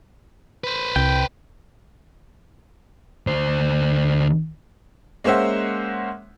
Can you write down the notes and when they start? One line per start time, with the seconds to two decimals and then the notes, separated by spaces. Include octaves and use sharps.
0.64 B4 C5
0.96 C2 G5
3.27 D2 C5
5.24 G#3 A#3 C#4 C5 E5 F#5